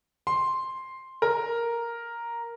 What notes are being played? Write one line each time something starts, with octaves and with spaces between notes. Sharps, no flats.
C6
A#4